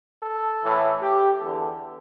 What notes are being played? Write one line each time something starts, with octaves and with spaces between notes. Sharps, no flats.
A4
A2 E3
G4
E2 D3 A4